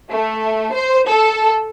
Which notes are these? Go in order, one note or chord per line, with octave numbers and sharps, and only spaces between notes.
A3
C5
A4